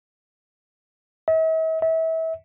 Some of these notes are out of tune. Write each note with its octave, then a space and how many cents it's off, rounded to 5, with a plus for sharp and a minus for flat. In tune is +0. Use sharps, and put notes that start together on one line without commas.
E5 -45
E5 -30